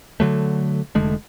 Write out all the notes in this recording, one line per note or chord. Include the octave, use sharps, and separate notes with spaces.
D3 F#3 A3
F1 D3 G#3 A3